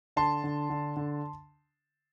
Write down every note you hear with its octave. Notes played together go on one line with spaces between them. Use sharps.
D3 A5 C6
D3
D3
D3